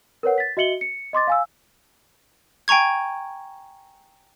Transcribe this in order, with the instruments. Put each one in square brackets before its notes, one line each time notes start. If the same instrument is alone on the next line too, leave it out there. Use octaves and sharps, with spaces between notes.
[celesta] A#4 B4 C#5 F#5
A6 B6
F#4 D#5 E5 C#7 F#7 G7
C#7
D#5 C6 D6 A6
F5 G#5 E6
[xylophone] G5 G#5 A#5 C#6 G#6